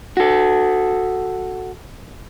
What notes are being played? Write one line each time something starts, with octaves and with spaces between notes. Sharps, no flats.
F#4 A4